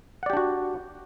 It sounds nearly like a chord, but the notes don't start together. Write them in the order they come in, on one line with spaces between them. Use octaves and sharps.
F#5 D5 G4 D4 F#4